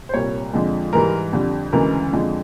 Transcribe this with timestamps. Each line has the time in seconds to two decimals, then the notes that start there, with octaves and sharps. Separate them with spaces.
0.09 C5
0.14 C2 A#2 G3 C#5
0.53 F2 D3 F3 G#3
0.93 G#2 E3 G3 A#4
1.33 F2 D3 G3
1.73 D2 C#3 E3 G#3 A#4
2.13 F2 D3 F3 G#3